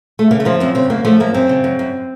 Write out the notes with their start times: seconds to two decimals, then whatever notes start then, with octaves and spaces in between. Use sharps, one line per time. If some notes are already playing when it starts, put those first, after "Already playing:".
0.19 A3
0.31 C#3 A#3
0.40 A3
0.45 F3 A#3
0.60 F#2 C4
0.75 C#3 C4
0.90 F#2 A#3
1.05 F3 A3
1.20 F#2 A#3
1.34 F#2 C4
1.49 C#3
1.64 F#2
1.79 F#2